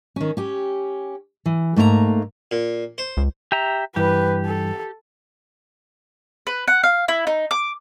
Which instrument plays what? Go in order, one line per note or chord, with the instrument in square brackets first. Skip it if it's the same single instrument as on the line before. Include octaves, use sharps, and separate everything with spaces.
[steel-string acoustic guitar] D#3 C#4
C#4 G4
E3
G#2 A3 A#3 C5 A#5
[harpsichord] A#2
C5
[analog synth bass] C#2
[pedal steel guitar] G4 E5 A#5
[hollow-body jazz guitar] G2 E3 [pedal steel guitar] G4 [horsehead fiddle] B4
[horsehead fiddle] A4
[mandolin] B4
F#5
F5
E4
D#4
D6